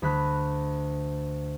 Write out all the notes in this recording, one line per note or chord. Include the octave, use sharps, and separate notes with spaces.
D2 B5 F#6